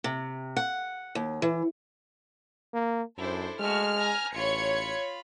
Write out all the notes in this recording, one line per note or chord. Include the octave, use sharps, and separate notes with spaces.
C3
F#5
D#2
E3
A#3
F#2 D4 E4 A4 C5
G#3 A3 F#4 F6
G#5 A#5
A1 F4 C#5 B5 G#6 C#7